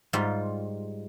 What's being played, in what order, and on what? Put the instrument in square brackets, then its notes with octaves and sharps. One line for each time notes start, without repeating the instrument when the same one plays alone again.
[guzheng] G#2 G3 F4